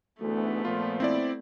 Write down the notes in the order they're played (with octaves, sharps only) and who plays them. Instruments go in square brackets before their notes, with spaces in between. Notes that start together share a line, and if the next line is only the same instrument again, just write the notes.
[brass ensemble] D2 G#2 E3 [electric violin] A3 B3
[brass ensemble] A#2 F3 [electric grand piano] F4
[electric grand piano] C4 E4 D5